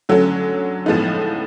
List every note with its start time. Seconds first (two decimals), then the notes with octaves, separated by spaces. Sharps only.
0.09 D3 F#3 A3 C#4
0.86 A2 F3 G#3 B3 D#4